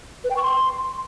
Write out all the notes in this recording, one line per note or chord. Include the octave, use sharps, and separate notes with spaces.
B4
G5
C#6
C6